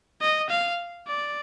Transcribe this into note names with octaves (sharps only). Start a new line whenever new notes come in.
D#5
F5
D5